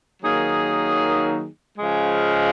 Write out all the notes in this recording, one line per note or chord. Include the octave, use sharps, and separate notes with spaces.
D#3 F#3 A#3 D#4 G#4
C#3 F3 G#3